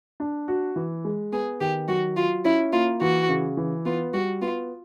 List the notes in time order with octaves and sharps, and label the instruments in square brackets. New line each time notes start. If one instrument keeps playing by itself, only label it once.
[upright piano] D4
F#4
E3
G#3
[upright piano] B3 [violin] G#4
[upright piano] D#3 [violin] G4
[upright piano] F#3 [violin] F#4
[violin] F4 [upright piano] F#4
[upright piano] C#4 [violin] E4
[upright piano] A#3 [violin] F4
[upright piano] E3 [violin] F#4
[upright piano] C#3
E3
[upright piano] B3 [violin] F4
[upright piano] G3 [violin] F#4
[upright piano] B3 [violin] F4